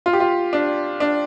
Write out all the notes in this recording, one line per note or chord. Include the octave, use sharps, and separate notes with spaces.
F4
G4
F4
D4
D4